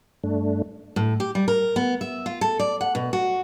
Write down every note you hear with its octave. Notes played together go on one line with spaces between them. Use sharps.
G2 A3 D4
A2
G4
G3
A#4
B3
E5
F4
A4
D5
F#5
B2
F#4